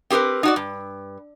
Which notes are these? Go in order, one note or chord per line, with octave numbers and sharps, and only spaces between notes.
C4 G4 G#4 A#4 B4
D#4 F#4 D5
G2